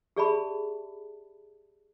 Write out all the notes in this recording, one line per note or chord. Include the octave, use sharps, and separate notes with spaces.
G4 G#4 D5 E5 A5 B5